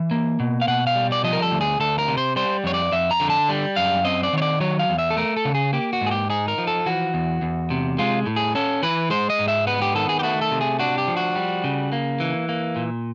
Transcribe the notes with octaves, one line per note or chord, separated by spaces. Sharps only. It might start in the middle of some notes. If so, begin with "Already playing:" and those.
Already playing: E3
A#3
B2
F5
B2 F#5
F5
G3
D5
F3 D#5
A#4
A4
D2
G#4
D2 A4
A#4
C3
C5
G3 C5
F2 C#5
D5
F2 E5
A#5
D3
A5
G3
F#2 F5
C4 D#5
D5
D#3 C#5
D5
F#3 C#5
F5
E2
E5
A4
A3 A#4
A4
C#3
G#4
A#3 G4
F#4
G#2
G#4
G4
D#4 G#4
A#4
F3
A4
E3 F#4
E2
E2
C3
G#3 F4
A2
G#4
C#4 A4
E3 B4
G#3 C5
D#5
G#2
E5
B3 B4
G4
D#3 A4
G#4
G4
A3 F#4
A4
C3
G#4
D4 F#4
G4
F3
F#4
G3
C#3
A#3
E3
A#3
A#2